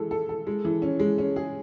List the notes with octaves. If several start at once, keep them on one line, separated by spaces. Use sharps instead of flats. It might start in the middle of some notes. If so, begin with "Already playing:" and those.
Already playing: E3 G#3 A4
A4
A4
G#3
E3
C#4
G#3
C#4
G#4